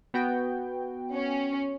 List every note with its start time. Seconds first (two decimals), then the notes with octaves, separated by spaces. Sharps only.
0.14 B3 F#4 G5
1.13 C#4